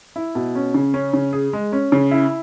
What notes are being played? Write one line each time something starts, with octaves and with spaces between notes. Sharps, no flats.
E4
B2
C#4
C#3
C#4
C#3
G#4
G#3
C#4
C#3
E4